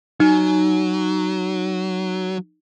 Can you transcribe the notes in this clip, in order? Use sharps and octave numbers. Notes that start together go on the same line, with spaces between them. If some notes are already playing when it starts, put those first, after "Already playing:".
F#3 D#4